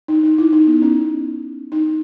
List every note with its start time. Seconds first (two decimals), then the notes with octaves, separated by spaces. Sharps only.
0.08 D#4
0.23 D#4
0.38 E4
0.52 D#4
0.67 B3
0.82 C#4
1.72 D#4